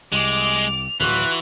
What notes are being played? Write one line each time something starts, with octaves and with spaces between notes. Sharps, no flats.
C2 G#3 D5 D6 F7
D1 E3 F4 F#4 F#6